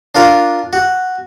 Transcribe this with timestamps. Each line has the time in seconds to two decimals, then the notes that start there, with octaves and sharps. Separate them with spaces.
0.15 D4 F4 A#4 F5
0.73 F#4